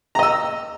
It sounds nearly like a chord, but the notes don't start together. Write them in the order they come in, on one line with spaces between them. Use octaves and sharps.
A#5 D#5 E6